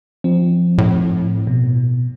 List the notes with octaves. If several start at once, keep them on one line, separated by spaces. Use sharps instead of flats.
F3 C4
A2
B2